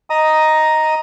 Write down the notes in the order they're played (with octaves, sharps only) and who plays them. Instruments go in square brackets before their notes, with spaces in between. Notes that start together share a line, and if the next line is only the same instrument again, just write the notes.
[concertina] D#5 A#5 D#6